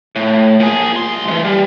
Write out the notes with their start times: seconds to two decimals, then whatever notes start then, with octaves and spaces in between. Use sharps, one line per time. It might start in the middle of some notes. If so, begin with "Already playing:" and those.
0.16 A2
0.60 A#2 G#4
0.96 C2 C6
1.28 E3 G#3
1.44 G3